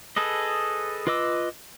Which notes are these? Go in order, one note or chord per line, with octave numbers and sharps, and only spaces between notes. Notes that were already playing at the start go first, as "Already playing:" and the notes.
G#4 A4 B4 D#5
F4 B4 D#5 D6 E6